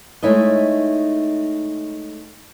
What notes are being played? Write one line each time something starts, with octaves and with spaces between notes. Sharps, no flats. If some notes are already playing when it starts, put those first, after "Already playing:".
G#3 A3 D#4 E4 C#5 D#5